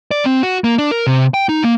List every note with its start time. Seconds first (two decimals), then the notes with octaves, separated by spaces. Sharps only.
0.11 D5
0.25 C4
0.43 F#4
0.64 A#3
0.78 D4
0.91 A#4
1.07 C3
1.34 G5
1.49 D#4
1.64 A#3